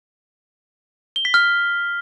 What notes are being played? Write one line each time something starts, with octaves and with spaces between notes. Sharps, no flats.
G7
B6
F6